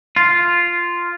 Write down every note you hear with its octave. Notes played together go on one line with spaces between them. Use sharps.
F4